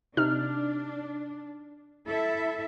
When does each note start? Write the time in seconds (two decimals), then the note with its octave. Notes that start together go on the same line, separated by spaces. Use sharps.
0.17 C3 D4 D#4 F6
2.07 E4 A4 E5